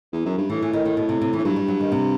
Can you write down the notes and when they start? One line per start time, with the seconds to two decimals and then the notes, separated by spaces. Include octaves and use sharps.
0.12 E2
0.25 F#2
0.38 G2
0.50 A2 E3
0.62 E3
0.73 D#3
0.85 D#3
0.97 B2
1.09 C3
1.21 C3
1.33 E3
1.38 A2
1.45 G2 F#3
1.56 G3
1.68 F#3
1.81 D#3
1.92 C3